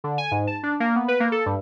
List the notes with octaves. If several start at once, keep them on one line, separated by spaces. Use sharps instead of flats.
D3
G#5
G#2
A5
D4
A#3
B3
B4
A#3
A4
G2